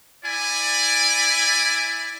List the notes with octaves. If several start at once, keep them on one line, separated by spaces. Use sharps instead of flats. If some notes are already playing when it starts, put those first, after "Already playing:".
E4 D5 G#5